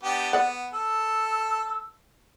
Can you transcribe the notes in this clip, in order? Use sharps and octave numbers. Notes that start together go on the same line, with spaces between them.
B3 D4 G4
B3 D5 F#5
A4 E6